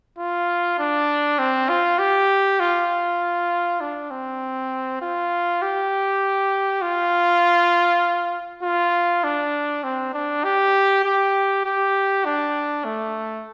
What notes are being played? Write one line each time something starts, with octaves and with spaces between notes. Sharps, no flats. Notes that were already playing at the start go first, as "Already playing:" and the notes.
F4
D4
C4
F4
G4
F4
D4
C4
F4
G4
F4
F4
D4
C4
D4
G4
G4
G4
D4
A3